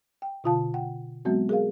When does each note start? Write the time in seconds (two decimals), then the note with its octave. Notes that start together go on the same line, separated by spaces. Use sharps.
0.22 G5
0.44 B2 D3 F4 F5 A5
0.74 F#5 G5
1.25 F#3 G#3 B3 C4 F#4
1.49 G#4 A#4 F5